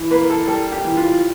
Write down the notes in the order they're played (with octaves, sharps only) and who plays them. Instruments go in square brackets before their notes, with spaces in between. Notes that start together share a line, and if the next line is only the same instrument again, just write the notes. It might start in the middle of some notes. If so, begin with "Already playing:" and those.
Already playing: [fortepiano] E3
A#3 B4
A4
G3 A4
G4
E3
F4